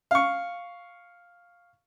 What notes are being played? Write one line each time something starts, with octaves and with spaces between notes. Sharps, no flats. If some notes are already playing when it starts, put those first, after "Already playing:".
F5 C#6